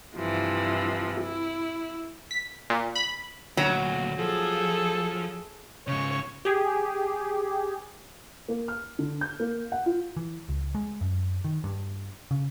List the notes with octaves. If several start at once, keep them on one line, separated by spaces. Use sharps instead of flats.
G2 C3 E3 F3
E4
B6
A#2
B5
D2 A#2 F#3
F3 G#4 A4
G#2 C#3 C#5
G4 G#4
A#3
F6
D3
G6
A#3
F#5
F4
E3
C#2
G#3
F#2
D#3
G2
C#3